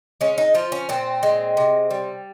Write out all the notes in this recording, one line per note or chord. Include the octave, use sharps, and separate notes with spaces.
G#3 C#4
D#4
F3 F4
C#4
A#2 C4
G#3
C3
G3